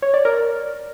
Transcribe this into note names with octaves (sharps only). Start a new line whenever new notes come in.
C#5
D5
A#4